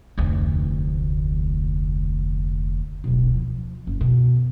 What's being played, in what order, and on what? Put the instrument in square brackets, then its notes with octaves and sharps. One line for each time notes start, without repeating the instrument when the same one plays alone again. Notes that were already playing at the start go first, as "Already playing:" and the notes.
[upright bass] F1 D2
D1 B1
F3
F#1
B2